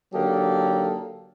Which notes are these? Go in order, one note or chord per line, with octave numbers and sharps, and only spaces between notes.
D3 F#3 A#3 D#4 G4 A4